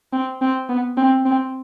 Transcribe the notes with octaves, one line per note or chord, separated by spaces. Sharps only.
C4
C4
B3
C4
C4